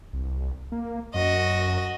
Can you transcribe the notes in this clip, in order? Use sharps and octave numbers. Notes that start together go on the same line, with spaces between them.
C2
A#3
F#2 F#4 D#5